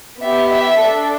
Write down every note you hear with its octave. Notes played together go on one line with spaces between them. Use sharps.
B3 G4 E5
E5
D4 A4